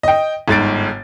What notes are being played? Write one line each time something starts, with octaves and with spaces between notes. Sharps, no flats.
D#5 G5
G1 G#2 A6 D7